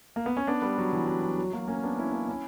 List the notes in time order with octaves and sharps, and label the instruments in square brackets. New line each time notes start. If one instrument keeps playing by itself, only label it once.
[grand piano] A#3
B3
C#4
B3 D4
G3 B3
F#3
E3
F#3
F#3
F#3
F#3 A#3
A#3 C#4
B3 D4
C#4 E4
A#3 C#4
C#4 E4